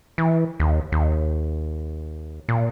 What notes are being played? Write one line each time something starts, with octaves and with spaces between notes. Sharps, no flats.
E3
D#2
D#2
A#2